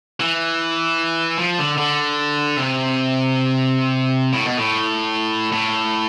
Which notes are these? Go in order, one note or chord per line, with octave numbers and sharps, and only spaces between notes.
E3
F3
D3
D3
C3
A2
B2
A2
A2